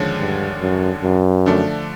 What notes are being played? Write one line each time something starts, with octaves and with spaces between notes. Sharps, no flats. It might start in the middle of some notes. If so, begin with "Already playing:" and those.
Already playing: D#2 D3 F3 G#3 C#4
G2
F#2
F#2
D3 F3 A3 D4